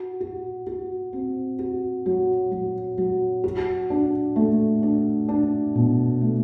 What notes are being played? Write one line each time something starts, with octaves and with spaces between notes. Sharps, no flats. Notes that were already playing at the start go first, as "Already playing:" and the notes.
Already playing: F#4
F#4
F#4
C4
F#4
F#3
F#3
F#3
F#4
D4
A3
D4
D4
B2
A3